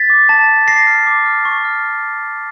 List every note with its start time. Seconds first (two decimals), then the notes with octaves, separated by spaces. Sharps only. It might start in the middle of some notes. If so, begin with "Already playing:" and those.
Already playing: A6 B6
0.10 D6
0.29 A5
0.48 A5
0.68 D6 A#6 C7
0.87 F6
1.07 D6
1.26 F6
1.45 C#6
1.65 F6